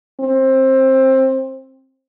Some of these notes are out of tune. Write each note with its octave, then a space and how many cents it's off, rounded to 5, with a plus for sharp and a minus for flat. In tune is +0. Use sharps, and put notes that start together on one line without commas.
C4 +20